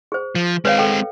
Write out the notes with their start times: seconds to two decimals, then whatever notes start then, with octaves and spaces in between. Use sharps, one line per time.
0.12 G#4 C5
0.35 F3
0.65 G#3 C4 B4 C#5 F5
0.79 A4 G5